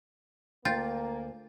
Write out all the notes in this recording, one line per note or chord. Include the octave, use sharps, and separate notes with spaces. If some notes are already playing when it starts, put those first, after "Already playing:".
D2 A#3 F4 G5 G6 A6